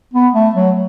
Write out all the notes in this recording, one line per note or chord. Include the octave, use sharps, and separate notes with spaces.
B3
A3
F#3